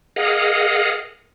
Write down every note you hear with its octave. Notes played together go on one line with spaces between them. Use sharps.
G#4 A#4 D#5 F5 F#5